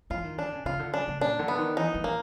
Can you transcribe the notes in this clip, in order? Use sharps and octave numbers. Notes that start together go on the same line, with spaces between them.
E3 F4
D#3
D3 D4
C#3
C#3 F4
D3
C#3 D4
C#3
A#2 D4
D3
B3
D#3
E3 D#4
E3
A#3